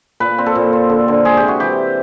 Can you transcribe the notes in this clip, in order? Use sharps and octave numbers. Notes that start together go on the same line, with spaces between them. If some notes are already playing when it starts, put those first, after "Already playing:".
A#2 B4
C4
A4
A#2
C4
D3
D3
G#3 G#4
C3 G4
F#4
E3 G4